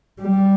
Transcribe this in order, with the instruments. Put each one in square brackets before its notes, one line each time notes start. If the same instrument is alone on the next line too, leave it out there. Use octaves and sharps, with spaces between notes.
[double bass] G3